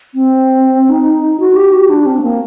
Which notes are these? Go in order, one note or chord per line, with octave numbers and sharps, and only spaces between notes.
C4
D#4
F#4
G4
F#4
D4
C4
A3
A#3